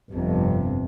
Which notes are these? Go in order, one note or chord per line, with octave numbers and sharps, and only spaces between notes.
G1 F2 C3